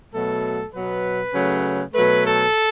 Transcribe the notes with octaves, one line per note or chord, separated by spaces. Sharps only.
B2 F#3 A3 A4
B2 F#3 B3 B4
C#3 F#3 A3
B2 F#3 A3 B4
A4